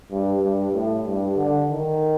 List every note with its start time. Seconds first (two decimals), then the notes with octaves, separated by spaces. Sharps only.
0.11 G2
0.43 G2
0.73 A2
1.06 G2
1.36 D3
1.68 D#3